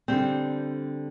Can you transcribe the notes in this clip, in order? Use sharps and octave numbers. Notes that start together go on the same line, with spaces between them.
D3 G3 C4